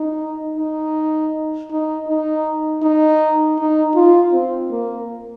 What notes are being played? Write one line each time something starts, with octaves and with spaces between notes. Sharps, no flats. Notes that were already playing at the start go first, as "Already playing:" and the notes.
Already playing: D#4
D#4
D#4
D#4
D#4
D#4
F4
C4
A#3